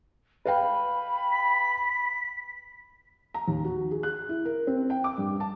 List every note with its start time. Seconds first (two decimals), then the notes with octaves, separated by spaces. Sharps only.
0.45 B4 F5 G5 B5
1.32 B6
3.34 A#5
3.48 D#2
3.64 F#4
3.91 G#4
4.03 F#6
4.29 E4
4.45 A#4
4.67 C4
4.90 G5
5.04 D6
5.18 G2
5.40 A5